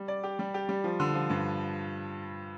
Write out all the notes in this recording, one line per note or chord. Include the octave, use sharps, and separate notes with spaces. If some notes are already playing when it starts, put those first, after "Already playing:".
Already playing: G3
D5
G4
G3
G4
G3
F3
D3
F3
G2